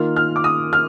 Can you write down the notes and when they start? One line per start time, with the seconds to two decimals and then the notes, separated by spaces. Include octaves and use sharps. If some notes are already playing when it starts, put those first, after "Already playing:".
Already playing: D#3 A#3 F4 F6
0.16 F6
0.36 D6
0.44 D#6
0.73 F6